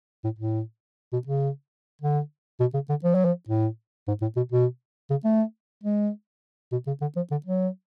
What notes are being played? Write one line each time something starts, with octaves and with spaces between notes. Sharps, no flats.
A2
A2
B2
C#3
D3
B2
C#3
D3
F3
F#3
F3
A2
G#2
A2
B2
B2
C#3
A3
G#3
B2
C#3
D3
F3
D3
F#3